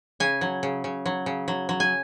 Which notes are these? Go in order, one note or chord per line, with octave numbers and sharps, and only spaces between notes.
C#3 G#5
F#3
C#3
C#3
F#3
C#3
F#3
F#3
G#5